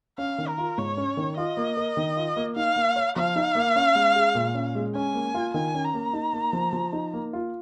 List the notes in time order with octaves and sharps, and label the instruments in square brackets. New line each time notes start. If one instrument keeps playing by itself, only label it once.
[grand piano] C#4 [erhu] F5
[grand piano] D#3
[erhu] A#4
[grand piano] F4
[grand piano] G#2 [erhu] C#5
[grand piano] C#4
D#3
[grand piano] F4 [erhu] D#5
[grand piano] A#3
A#4
D#3
F4
A#3
[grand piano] D#4 [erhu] F5
[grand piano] A#3
C#5
[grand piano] F3 [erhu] F5
[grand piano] D#4
A#3
C#4
G#3
G#4
A#2
C#4
G#3
[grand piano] C#4 [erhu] G#5
[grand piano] A#3
F4
[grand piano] D#3 [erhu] G#5
[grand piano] C#4
[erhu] A#5
[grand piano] A#3
D#4
A#3
F3
F3
D#4
A#3
F4